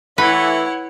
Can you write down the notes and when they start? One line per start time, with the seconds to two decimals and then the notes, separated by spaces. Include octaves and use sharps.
0.18 E3 A3 E4 B4 C#5 F#5